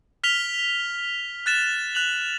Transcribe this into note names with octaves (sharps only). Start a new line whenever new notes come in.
F6 B6 F7 G7
F#6 A6 E7
F#6 F7 F#7